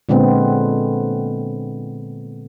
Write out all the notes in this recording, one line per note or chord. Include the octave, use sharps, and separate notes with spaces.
A#2 D3 G#3 B3 C4